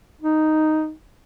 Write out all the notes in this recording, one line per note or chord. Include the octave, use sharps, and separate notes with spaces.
D#4